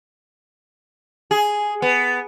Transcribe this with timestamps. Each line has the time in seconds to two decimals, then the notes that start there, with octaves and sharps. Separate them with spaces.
1.31 G#4
1.82 B3